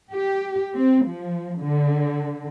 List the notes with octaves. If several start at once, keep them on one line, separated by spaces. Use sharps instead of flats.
G4
C4
F3
D3